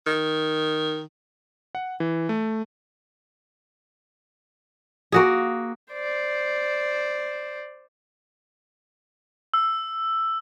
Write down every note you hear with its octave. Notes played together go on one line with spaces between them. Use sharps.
D#3
F#5
E3
A3
A#3 F#4 G#4
C5 D5
E6